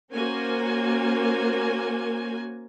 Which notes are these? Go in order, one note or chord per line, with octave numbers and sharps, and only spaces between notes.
A#3 C#4 F#4 A#4 C5 G#5